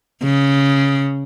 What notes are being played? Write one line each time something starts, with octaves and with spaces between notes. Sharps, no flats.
C#3